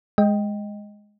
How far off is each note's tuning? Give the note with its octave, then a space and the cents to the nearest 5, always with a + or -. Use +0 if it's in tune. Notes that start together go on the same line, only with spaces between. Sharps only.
G#3 +0 D#5 +0 G5 +5